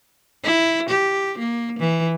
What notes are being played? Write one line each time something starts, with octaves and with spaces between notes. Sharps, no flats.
E4
G4
A#3
E3